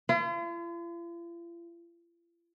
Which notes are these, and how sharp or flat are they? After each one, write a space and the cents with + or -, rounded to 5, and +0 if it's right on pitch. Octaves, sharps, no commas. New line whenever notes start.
F4 -45